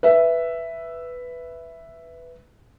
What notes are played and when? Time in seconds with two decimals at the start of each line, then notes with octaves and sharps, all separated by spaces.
0.03 B4 E5